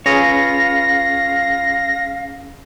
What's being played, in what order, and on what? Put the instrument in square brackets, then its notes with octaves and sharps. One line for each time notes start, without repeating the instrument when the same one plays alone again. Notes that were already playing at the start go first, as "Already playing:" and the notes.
[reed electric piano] C#4 G#4 [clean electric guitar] F4 B4 C#5 [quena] F5 [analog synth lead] A#6